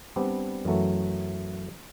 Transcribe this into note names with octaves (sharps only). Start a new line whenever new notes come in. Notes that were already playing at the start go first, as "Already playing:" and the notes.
G3 B3 C4 D4
F#2 E3 F#3 A3